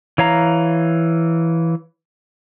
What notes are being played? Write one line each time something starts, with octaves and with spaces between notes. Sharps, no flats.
E3 C#5 F5 A#5